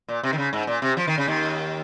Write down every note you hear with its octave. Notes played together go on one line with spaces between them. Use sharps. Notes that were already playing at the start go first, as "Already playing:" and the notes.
A#2
C3
D#3
C#3
G#2
A#2
C3
F3
D#3
C#3
D#2 D#3